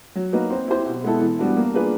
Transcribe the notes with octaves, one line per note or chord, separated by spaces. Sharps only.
F#3
A#3 D#4 F#4 B4
C4
E4 G4 C5
B2
G#3 B3 E4 A4
E3
G3 B3 D4 F#4
A#3
D4 F4 G#4 B4